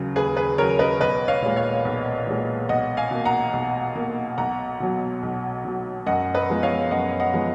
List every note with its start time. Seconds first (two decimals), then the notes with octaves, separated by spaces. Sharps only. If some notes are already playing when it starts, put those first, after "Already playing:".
Already playing: D#2 C#3 F#3
0.16 D#2 G#4 B4
0.37 G#4 B4
0.58 C#3 F#3 A#4 C#5
0.79 B4 D#5
1.00 B1 B4 D#5
1.28 C#5 F5
1.42 A#2 G#3
1.56 C#5 F5
1.85 B1
2.27 A#2 G#3
2.69 B1 D#5 F#5
2.97 F5 G#5
3.11 B2 A#3
3.25 F#5 A#5
3.53 B1
3.95 B2 A#3
4.38 B1 F#5 A#5
4.80 B2 F#3
5.23 B1
5.65 B2 F#3
6.06 F#2 D#5 F#5
6.35 B4 D#5
6.49 F3 G#3 B3
6.63 C#5 F5
6.91 F#2 D#5 F#5
7.20 D#5 F#5
7.34 F3 G#3 B3